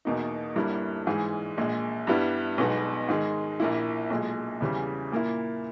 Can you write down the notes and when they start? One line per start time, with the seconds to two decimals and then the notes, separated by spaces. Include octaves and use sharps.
0.05 E2 B2 A#3 D#4
0.56 G1 G2 G3 A#3 E4
1.07 G#2 E3 G#3
1.57 A#1 A#2 G#3
2.07 G2 G3 B3 E4
2.58 B1 B2 G#3 B3 D#4
3.08 G#2 D#3 G#3
3.60 A#1 A#2 A#3 E4
4.10 B1 A#2 G#3
4.61 E2 C#3 E3 G3
5.12 A#2 A#3 E4